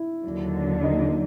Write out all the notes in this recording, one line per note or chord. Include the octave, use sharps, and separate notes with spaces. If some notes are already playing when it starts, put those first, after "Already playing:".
Already playing: E4
D#2 D3 F#3
D#4 D#5